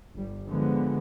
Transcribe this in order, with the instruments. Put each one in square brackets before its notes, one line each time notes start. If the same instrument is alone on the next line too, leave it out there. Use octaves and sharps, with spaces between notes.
[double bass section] G1 G3
D3 F3 G#3 B3